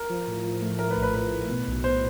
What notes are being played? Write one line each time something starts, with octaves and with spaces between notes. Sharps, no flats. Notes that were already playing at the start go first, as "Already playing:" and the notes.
Already playing: A#4
F3
A2
F3
A3
A3 A#4
B4
A#1
B4
A2 B4
A2
B2
B1
B2 C5